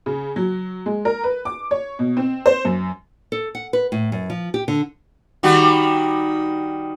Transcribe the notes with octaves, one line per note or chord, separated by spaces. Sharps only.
C#3
F#3
G#3
A#4
B4
D6
C#5
B2
C4
C5
F#2
A4
F#5
B4
A2
F#2
F3
G4
D3
D#3 G3 F#4